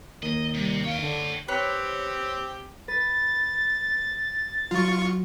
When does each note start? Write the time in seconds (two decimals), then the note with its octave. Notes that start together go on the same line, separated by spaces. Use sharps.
0.23 D#2 D#5
0.54 C3 G3
0.84 C#5 F5 G5
1.01 D3
1.48 C4 G4 B4 C#5
2.88 B4 A6
4.71 F#3 F4 C#6